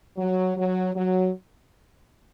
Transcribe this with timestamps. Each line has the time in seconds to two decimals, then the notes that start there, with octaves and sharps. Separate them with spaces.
0.17 F#3
0.56 F#3
0.95 F#3